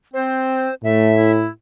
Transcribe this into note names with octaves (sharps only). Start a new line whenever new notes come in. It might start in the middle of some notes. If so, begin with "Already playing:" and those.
C4 C5
A2 A3 E5
E4